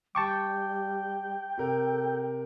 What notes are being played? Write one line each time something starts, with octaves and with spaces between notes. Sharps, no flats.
G3 G5 A5 C#6 D6
C3 A4 A#4